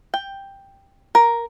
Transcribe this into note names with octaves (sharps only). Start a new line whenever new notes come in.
G5
A#4